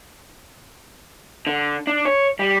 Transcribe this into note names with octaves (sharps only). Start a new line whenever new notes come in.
D3
D4
C#5
G3